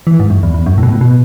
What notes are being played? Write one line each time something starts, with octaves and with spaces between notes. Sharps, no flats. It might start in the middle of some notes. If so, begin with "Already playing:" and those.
E3
G#2
F#2
E2
E2
F#2
A2
B2
A2
B2